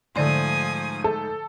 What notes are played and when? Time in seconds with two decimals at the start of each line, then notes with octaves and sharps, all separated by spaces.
0.16 G#2 D3 F3 A3 D5 G#5 C6 D#6
1.04 A4